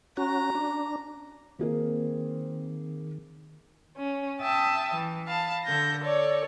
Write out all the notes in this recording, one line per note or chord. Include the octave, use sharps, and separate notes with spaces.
C#4 F#4 A#5
D4
D#3 A#3 C4 G#4 A#4
C#4
E5 G5 A5 D#6
E3
F5 A5 B5
D3 A4 G6 A#6
A4 C#5 D5